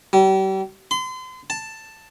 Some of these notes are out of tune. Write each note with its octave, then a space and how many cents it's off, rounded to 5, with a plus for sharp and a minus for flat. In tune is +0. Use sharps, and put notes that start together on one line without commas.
G3 -40
C6 -35
A5 +5